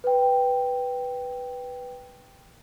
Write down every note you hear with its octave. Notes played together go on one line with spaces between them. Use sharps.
B4 G5